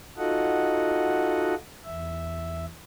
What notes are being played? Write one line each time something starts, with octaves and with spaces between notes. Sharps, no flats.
D#4 F4 F#4 A4 D#5 F#5
E2 E5